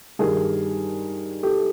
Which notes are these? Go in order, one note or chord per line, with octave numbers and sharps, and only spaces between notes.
G2 D#3 G3 G#4 A#4
G4 A4